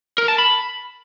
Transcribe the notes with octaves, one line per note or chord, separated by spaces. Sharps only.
A#4
A5
B5